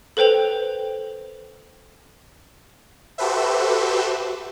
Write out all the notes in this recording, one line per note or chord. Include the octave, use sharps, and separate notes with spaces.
A4 B4 C5 G5 F7
F#4 G4 A4 B4 C5 E5